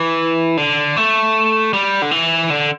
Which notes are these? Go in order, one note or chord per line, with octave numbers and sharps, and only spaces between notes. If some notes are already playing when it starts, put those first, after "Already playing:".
Already playing: E3
D3
A3
G3
D3
E3
D3